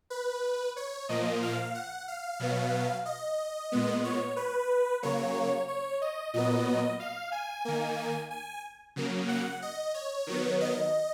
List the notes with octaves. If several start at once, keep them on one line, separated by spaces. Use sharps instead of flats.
B4
C#5
A#2 F3 A#3 D#5
F5
F#5
F5
B2 F#3 B3
D#5
A#2 G#3 B3
C#5
B4
C#3 F#3 A#3 C#5
C#5
D#5
A#2 F#3 B3 D#5
F5
G#5
D#3 A#3
G#5
C#3 F#3 A#3
F#5
D#5
C#5
D#3 F#3 B3
D#5